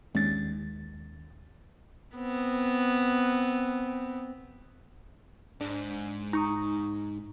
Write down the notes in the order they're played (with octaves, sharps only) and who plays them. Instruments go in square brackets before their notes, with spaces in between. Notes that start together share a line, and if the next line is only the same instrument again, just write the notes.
[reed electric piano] D#2 A6 [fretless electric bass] G#3 C#4 D4
[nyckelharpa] B3 C4
[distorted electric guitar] G#2 [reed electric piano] D4
[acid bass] D#4 [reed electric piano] A#5 C#6 D#6